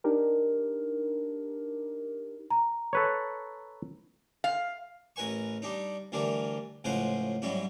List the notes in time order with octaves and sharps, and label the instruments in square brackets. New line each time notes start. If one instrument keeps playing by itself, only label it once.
[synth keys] D4 D#4 G4 A#4
[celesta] A#5
[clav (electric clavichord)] A4 B4 C#5
[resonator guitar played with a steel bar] F5
[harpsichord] A1 A#4 B4 G#5 C#6
G3 D4 D#4
D2 E3 G3 D4 A#4
C#2 A2 C#3 F3 C5 F#5
G#2 F#3 G3 C#4 E4